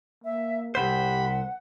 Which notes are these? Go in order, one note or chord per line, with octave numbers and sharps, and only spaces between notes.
A#3 E5
C2 C3 G4 C5 F#5 B5